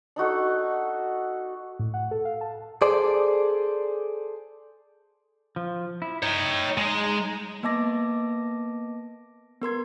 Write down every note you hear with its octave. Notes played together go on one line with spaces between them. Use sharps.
D4 D#4 F#4 A4
A2
F#5
A4
F5
A5
G#4 A4 C5 D5
F3
E4
D#4 C#5 G5
G#3
A#3 B3 D#5 A5 D6 A#6
B3 A#4 C6 G#6